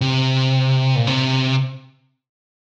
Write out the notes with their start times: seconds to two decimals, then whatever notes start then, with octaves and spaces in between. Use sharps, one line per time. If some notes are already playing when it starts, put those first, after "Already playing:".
0.01 C3
0.96 A#2
1.07 C3